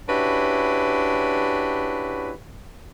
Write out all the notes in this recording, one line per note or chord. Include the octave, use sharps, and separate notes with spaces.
C#4 D4 E4 F#4 G4 B4